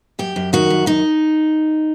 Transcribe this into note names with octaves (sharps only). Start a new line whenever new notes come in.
F#2 G4
F#2
D#3 F#4
F#2
D#3 D#4